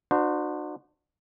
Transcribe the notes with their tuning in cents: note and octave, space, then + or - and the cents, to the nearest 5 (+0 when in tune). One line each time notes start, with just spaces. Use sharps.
D4 +40 F#4 -25 C5 -20